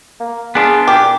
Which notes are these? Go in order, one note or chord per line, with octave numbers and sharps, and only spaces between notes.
A#3
B3 D4 F4 G#4
A#2 G4